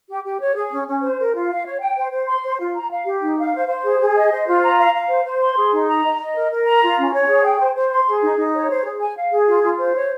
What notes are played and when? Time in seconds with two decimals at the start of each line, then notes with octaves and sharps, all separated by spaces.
0.09 G4
0.24 G4
0.40 C#5
0.56 G#4
0.71 C#4
0.87 C#4
1.03 C5
1.18 A#4
1.34 F4
1.50 F5
1.66 C#5
1.81 G5
1.96 C5
2.12 C5
2.28 C6
2.43 C5
2.59 F4
2.75 A#5
2.91 F5
3.06 G4
3.21 D#4
3.38 F5
3.54 C5
3.69 C5
3.85 G#4
4.00 G#4
4.16 D#5
4.31 C5
4.47 F4
4.62 A#5
4.78 F5
4.94 F5
5.09 C5
5.25 C5
5.41 C6
5.57 G#4
5.72 D#4
5.88 A#5
6.03 D#5
6.19 D#5
6.35 A#4
6.51 A#4
6.66 A#5
6.82 F4
6.98 C#4
7.13 C#5
7.28 G#4
7.44 G5
7.60 C5
7.75 C5
7.91 C6
8.07 G#4
8.23 D#4
8.38 D#4
8.53 C#5
8.70 C5
8.85 G#4
9.01 G#5
9.17 F5
9.32 G#4
9.47 F4
9.63 F4
9.80 C5
9.95 C#5